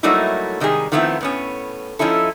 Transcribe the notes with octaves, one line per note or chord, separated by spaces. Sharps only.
F#3 G3 A3 A#3 D#4 E4
C3 D#3 G3 G#3 G#4
D#3 F3 A3 B3 C4 E4
A2 B3 C#4
F3 C#4 D#4 E4 A4